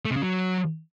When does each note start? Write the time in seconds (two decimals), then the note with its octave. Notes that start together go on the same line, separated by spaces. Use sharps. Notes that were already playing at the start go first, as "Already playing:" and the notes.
0.05 A3
0.11 C3
0.17 C#3
0.22 F#3